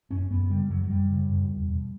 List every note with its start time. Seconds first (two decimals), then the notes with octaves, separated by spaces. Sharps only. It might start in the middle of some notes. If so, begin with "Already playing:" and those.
0.11 F#2 C#4
0.30 F#2 B3
0.50 C#3 G3
0.70 F#2 F#3
0.83 F#3
0.89 F#2 G3
1.09 C#3
1.29 F#2
1.48 E2
1.68 B2